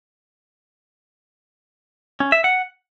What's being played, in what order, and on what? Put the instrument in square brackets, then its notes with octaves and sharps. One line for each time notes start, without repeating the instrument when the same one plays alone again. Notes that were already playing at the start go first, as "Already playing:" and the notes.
[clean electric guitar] C#4
E5
F#5